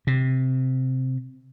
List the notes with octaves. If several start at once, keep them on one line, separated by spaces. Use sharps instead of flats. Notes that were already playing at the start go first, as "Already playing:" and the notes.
C3